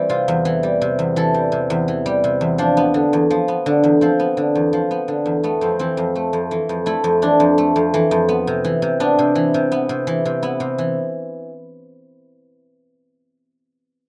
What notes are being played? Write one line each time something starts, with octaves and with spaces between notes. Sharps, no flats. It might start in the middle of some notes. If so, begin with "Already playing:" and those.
Already playing: E3 G3 C4
C3 F4
E2
E3
G3
C3
E2
E3 A4
G3
C3
E2
E3
G3
C3
E2
F3 D4
B3
D3
E2
F3
B3
D3
E2
F3 C4
B3
D3
E2
F3
B3
D3
E2
A3 B3
F2 C4
E3 C4
F2
A3
F2
E3
F2
A3 E4
F2
E3 D4
F2
A3
F2
E3
F2
B3
C3
E3
C3
B3 D4
C3
E3
C3
B3
C3
E3
C3
B3 E4
C3
E3